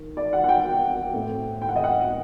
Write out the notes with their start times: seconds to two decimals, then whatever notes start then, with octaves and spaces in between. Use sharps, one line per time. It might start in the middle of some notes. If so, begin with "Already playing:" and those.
Already playing: D#3
0.17 D5
0.33 F#5
0.44 F#5
0.49 G5
1.14 A2 A3 C4
1.62 G5
1.69 F#5
1.76 D#5
1.84 F#5